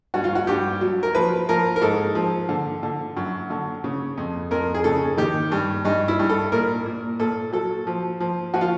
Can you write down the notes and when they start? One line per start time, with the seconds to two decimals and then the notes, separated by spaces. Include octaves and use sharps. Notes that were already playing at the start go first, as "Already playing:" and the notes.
0.14 G2 F#4
0.24 F4
0.35 F#4
0.47 G2 G4
0.81 F#3
1.03 A#4
1.15 F3 B4
1.49 F3 A#4
1.76 A#4
1.82 G#2 A4
2.15 F3
2.49 D3
2.83 D3
3.17 F#2
3.50 D3
3.84 C#3
4.18 F2
4.51 F2 A#4
4.75 G#4
4.84 C#3 A4
5.17 D#3 G4
5.52 G2
5.85 G2 D#4
6.08 E4
6.19 G2
6.29 A4
6.52 A#2 A#4
6.86 A#2
7.19 A#2 A4
7.53 F#3 A4
7.87 F3
8.20 F3
8.54 F3 F#4
8.61 F4